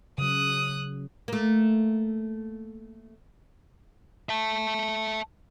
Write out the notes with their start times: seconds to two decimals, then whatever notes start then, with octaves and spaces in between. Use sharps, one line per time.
0.18 C#3 F#3 D#6 F#6
1.28 A3 A#3
4.29 E5 A5